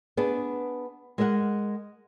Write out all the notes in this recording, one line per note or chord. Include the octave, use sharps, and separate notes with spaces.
B3 D4 G#4
G#3 A#4 D#5 E5 F#5